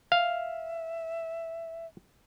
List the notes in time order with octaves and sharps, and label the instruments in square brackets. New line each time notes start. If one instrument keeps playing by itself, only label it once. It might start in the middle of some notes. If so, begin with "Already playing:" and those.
[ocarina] E5 [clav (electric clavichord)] F5